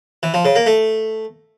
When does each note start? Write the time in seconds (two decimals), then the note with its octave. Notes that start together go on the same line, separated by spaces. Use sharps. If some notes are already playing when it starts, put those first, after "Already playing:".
0.23 E3
0.34 F3
0.45 C#3
0.56 A#3
0.66 A3